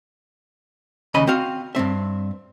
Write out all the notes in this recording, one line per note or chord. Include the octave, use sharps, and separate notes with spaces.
D#2 C#3 D#5 B5
C4 F#4 F5
G2 C#3 C4 E5